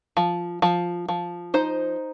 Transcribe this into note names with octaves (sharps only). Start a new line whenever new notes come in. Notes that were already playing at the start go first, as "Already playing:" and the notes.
F3
F3
F3
D#4 C5